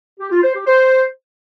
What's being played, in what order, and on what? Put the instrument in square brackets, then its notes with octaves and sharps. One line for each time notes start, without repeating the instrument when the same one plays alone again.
[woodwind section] G4
F4
C5
G4
C5